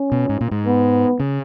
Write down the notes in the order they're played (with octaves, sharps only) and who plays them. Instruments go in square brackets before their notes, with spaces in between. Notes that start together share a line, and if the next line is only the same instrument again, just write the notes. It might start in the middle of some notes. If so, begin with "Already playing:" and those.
Already playing: [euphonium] C#4
[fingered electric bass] B2
G#2
A#2
G#2
[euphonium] B3
[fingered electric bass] C#3